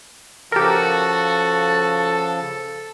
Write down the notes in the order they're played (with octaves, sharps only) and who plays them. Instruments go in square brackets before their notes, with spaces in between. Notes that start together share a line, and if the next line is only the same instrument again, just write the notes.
[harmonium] C#3 F3 [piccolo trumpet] F#4 [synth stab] G4 A#4 [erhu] A4